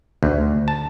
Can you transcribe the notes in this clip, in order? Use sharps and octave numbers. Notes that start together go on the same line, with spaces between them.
D2
A5